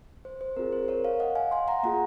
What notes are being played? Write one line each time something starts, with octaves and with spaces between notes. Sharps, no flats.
C5
C5
C4 F4 G#4 A#4
C5
A#4 C#5
C#5 F5
D#5 F#5
F5 G#5
G#5 C6
F#5 A#5
A#3 F4 G#4 F#5 A#5